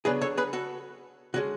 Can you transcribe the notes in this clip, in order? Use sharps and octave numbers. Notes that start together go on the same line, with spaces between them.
C#3 F#3 B3 D4 G#4 B4
A4 C#5
G#4 B4
F#4 A4
D3 G#3 C#4 F#4